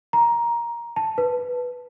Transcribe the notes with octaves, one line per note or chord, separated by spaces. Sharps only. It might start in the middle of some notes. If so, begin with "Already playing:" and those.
A#5
A5
B4